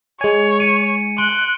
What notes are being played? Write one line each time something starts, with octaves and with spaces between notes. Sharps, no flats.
G#3 C#5 G#5
C#7 D#7
C6 F#6 D7 G7